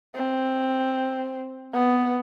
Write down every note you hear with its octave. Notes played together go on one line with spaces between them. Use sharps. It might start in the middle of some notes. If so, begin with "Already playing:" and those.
C4
B3